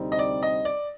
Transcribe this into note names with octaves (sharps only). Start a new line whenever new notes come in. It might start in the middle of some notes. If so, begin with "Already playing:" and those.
Already playing: D2 C3 G3 C4 D#4
D#5
D5
D#5
D5